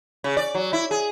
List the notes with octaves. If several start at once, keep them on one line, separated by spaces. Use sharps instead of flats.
C#3
D5
F#3
E4
G#4